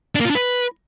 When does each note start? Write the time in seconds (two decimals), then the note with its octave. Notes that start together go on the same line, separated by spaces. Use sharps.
0.15 D4
0.20 A#3
0.25 F4
0.30 D4
0.35 B4